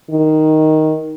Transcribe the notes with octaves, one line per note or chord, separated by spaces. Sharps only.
D#3